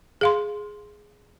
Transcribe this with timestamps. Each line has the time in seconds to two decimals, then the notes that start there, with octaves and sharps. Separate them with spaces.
0.21 G#4 F5 C6